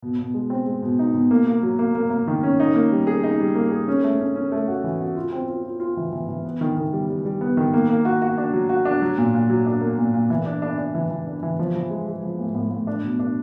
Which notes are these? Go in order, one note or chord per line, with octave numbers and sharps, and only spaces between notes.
B2
B2
G#3
C4
G#3
B2
D#4
B2
A#3
A#3
F#3
A#3
A#3
A#3
D#3
C#4
D#4
A#3
G3
G#4
D#4
G3
A#3
G#4
C#4
A3
C#4
C#4
A3
F#4
E3
F#4
F4
C4
F4
F4
F4
E3
E3
E3
B3
D#3
D#3
G3
G3
G3
B3
D#3
A#3
A#3
F#4
F#4
D4
F#3
F#4
D4
F#3
A#2
A#2
F#3
D4
A#3
A#2
A#2
E3
D4
D4
D4
E3
E3
D4
E3
F3
F3
G#3
G#3
F3
A2
A2
A2
D4
B2
D4